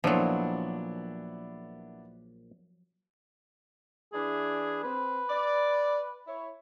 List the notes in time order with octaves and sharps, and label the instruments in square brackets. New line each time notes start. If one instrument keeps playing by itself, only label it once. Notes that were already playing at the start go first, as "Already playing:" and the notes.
[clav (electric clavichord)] A#1 A#2 [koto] F3 F#3 [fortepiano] B3 D4 E4
[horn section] E3 D4 [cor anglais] G#4
[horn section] C4 [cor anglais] B4
[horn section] D5
E4 C#5